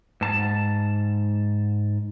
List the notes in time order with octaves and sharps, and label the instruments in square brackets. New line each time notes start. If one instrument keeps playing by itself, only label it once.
[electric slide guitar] G#2 A5